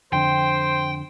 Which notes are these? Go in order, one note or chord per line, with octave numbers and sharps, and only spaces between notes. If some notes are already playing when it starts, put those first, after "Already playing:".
F2 D3 C5 G5